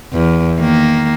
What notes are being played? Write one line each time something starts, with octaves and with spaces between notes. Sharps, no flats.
E2
D#3 A#3